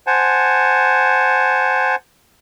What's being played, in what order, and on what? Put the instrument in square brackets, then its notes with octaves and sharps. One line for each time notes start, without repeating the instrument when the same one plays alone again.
[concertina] C5 F#5 G#5 A5